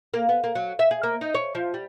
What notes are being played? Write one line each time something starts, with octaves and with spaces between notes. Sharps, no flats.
A#3
B3
A#3
F#3
E5
G#4
A#3
D#4
C#5
F3
G3